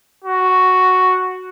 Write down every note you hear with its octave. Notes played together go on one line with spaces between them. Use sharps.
F#4